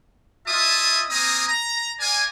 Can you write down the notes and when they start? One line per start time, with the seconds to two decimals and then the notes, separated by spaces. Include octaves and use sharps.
0.47 E4 F4 D#5 E5 A5 D#6
1.10 A#3 C4 G#5 A#5 D#6
1.47 A#5
2.00 A#4 D5 F5 G#5